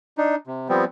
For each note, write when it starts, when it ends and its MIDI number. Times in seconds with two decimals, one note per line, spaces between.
0.18 0.35 62
0.18 0.35 63
0.47 0.68 48
0.69 0.85 53
0.69 0.85 55
0.69 0.85 59
0.69 0.85 60